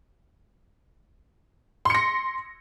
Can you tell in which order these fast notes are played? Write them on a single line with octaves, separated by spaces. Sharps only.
C6 C#7 A#6